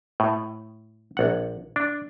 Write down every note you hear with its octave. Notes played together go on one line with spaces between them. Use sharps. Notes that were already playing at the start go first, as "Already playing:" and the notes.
A2
A#1 F#5
D4